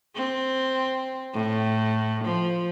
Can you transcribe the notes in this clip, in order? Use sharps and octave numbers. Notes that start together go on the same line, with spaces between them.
C4
A2
F3